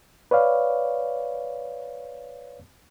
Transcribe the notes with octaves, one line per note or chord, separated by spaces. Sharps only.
B4 C#5 D5 F5